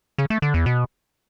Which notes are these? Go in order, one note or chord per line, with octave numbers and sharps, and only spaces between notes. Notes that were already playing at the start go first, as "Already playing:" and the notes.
C#3
A3
D3
E2
B2